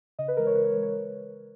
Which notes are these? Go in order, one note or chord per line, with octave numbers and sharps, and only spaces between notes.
C#3 D#5
B4
E3 G#3 A#4
C#5
C#3 B4
A#4
E3 G#3 B4
C#5